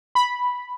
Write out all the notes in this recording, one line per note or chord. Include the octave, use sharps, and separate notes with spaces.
B5